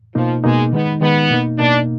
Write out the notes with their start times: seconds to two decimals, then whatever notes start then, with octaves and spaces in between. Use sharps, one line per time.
0.15 B2 F3 A#3 D#4
0.44 B2 G#3 A#3 D#4
0.72 D#3 G#3 B3 D#4
1.01 D#3 G#3 B3 D#4
1.30 B2 A#3 D#4
1.58 B2 A#3 D4 D#4